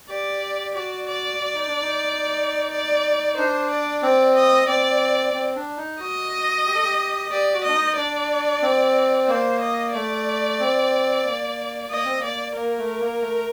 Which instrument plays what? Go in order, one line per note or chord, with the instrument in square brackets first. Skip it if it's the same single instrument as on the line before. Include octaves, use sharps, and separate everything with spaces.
[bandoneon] G4 [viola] D5
[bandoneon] F#4 [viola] D5
[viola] D5
[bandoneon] F#4
D#4
D4
D#4
[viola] D5
[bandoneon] D4 [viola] C5
[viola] D5
[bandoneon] C4 [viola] D5
[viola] D#5
[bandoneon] C4 [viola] D5
[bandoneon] C4
D4
D#4
[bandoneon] F#4 [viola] D#5
[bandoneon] G4
A4
G4
[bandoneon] G4 [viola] D5
[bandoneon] F#4
[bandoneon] D4 [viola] D#5
[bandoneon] D#4
[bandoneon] D4 [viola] D5
[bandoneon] C4
[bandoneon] A#3 [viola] C5
[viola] D#5
[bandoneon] A3 [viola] D5
[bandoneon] C4
A#3
[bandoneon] A#3 [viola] D#5
[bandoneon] C4
[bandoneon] A#3 [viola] D5
[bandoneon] A#3 [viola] A#4
[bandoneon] A3
A#3
A3